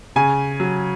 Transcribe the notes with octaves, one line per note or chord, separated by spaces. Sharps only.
C#3 G#5
F#3